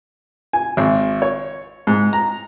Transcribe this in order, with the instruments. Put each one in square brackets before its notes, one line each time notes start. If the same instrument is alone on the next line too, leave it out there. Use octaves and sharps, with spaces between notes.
[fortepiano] G#5
G#1
C#5
G#2
A#5